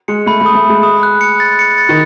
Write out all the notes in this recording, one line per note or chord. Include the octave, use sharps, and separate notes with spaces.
G#3 C#7
A3 B5
A3
D#6
A3
D#6
G#3
D#6
F#6
C#7
A6
C#7
A6
D#3